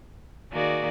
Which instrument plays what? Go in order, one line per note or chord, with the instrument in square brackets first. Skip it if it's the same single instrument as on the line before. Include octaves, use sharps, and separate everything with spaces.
[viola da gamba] D#3 F#4 D5 [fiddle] A#3 G#4